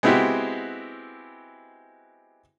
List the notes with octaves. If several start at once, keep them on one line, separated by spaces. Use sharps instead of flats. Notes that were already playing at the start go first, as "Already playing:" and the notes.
G#3 B3 C4 E4 F#4 G4